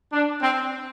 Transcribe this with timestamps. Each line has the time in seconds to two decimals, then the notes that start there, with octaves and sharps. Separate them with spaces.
0.12 D4
0.41 C4